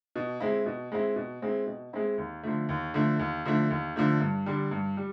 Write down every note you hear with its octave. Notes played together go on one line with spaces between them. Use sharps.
B2
G#3 C4 E4
B2
G#3 C4 E4
B2
G#3 C4 E4
B2
G#3 C4 E4
D#2
D3 F3 A3
D#2
D3 F3 A3
D#2
D3 F3 A3
D#2
D3 F3 A3
G2
D3 G3
G2
G3